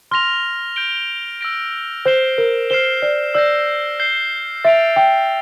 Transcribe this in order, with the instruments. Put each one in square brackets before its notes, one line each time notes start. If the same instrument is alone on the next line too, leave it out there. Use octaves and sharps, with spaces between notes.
[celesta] C6 [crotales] F6 A#6 F7
[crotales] G6 D7 G7
E6 A#6 D7
[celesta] C5 [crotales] G6 C7 E7 G7
[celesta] A#4
[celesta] C5 [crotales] F6 C7 E7 G7
[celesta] D5
[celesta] D5 [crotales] E6 G6 A#6
[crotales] G6 C7 G7
[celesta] E5 [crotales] A6 D7 F7
[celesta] G5